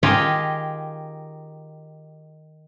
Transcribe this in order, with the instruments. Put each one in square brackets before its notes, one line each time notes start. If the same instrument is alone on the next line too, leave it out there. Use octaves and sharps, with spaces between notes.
[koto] D#3 D#4 F4 G4 G#4